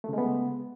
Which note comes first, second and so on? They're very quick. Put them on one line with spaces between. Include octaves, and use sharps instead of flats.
A3 C#3 G#3 B3